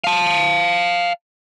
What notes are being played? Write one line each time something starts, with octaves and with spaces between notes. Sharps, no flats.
F5 A5